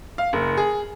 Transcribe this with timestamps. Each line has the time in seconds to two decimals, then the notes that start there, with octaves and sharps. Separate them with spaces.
0.18 F5
0.33 F#1
0.57 G#4